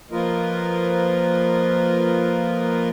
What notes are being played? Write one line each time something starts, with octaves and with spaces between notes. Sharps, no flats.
F3 A#3 F4 A#4 B4 D#5